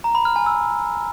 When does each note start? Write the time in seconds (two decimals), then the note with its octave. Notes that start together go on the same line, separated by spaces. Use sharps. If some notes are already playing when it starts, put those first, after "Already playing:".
0.04 A#5
0.15 B5
0.25 F6
0.36 G#5
0.46 E6